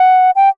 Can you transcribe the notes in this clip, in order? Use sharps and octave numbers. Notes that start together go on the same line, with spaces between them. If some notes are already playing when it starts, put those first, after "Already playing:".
Already playing: F#5
G5